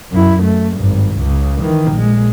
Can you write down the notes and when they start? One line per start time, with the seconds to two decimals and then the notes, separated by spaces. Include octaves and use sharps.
0.11 F#2 E4
0.43 A3
0.76 G#1 G2
1.17 C#2 C#3
1.61 D#3 E3
1.92 A#1 G#3